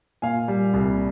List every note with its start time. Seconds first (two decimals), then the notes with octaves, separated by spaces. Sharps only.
0.22 A#2 F5 G#5
0.48 G3
0.74 C2